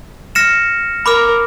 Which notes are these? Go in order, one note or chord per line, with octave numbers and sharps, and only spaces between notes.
F6 A#6 C#7 E7
A#4 B5 D6 F6